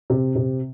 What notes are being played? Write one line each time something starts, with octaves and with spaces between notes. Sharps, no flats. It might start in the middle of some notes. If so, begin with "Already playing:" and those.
C3
C3